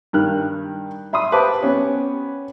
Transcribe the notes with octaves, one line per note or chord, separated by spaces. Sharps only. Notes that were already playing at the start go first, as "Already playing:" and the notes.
G2 D#3 A#4 F6 F#6
E5 B5 C6 D#6
G4 B4 C5 F5 A5 D6
B3 C#4 G4